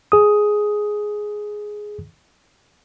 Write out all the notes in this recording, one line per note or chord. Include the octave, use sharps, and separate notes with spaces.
G#4 D#6